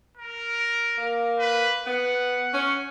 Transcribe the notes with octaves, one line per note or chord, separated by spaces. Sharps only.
A#4
A#3
B4
B3 F#5
C#4